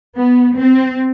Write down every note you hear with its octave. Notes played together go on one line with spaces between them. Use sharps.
B3
C4